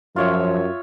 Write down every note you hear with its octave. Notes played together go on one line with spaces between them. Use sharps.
F#2 F3 F4 C#5 E5